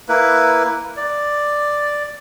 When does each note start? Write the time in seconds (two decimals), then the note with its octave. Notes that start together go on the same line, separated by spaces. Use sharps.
0.09 A#3 E4 B4
0.97 D5